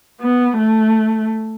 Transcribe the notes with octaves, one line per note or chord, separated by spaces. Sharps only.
B3
A3